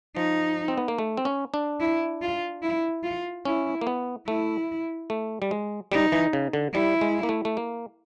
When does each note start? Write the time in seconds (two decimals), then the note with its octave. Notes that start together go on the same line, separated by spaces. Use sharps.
0.16 F3 D#4
0.68 C4
0.77 B3
0.88 A#3
0.98 A3
1.17 C4
1.25 C#4
1.54 D4
1.80 E4
2.22 F4
2.63 E4
3.03 F4
3.45 C#4 E4
3.81 A#3
3.87 B3
4.27 A3 E4
5.10 A3
5.42 G3
5.51 G#3
5.92 G3 D#4
6.12 E3
6.33 C#3
6.53 D3
6.74 G3 E4
7.01 G#3
7.23 A#3
7.29 A3
7.45 A3
7.57 A#3